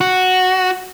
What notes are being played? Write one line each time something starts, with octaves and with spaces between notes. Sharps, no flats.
F#4